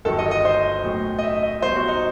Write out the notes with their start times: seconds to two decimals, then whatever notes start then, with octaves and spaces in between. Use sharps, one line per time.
0.05 G1 G2 D#3 F#3 A4
0.18 D#5
0.31 D#5
0.45 C5
0.84 B1 A2 F#3
1.19 D#5
1.23 E5
1.43 D#5
1.62 C2 B2 F#3 C5
1.76 F#4
1.88 D#4